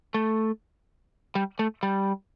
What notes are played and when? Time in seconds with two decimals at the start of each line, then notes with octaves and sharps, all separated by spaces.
0.14 A3
1.35 G3
1.59 A3
1.83 G3